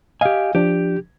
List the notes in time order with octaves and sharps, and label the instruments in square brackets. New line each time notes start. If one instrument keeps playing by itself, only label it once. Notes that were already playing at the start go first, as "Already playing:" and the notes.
[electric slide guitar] G4 G#5 [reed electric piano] D#5 F5
[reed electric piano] F3 D4 [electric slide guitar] G4